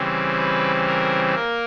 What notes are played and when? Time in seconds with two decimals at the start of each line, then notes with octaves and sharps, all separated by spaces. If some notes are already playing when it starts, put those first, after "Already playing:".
Already playing: C#3 E3 G3 C4
0.38 B4
0.86 A#4
1.34 A#3 A#4